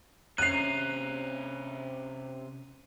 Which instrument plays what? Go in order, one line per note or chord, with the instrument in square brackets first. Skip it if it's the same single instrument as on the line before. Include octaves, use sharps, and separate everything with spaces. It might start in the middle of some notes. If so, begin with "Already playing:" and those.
[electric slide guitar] C3 C#5 [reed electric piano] C#4 A#5 [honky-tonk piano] F#6 C7 [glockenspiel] D#7 F7